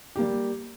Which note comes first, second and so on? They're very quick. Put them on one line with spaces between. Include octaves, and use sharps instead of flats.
G4 A#3 G3